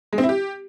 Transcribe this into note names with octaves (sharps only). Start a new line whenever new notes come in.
G#3
C4
E4
G4